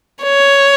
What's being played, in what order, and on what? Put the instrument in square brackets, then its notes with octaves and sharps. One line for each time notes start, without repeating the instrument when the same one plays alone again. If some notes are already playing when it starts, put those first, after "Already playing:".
[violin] C#5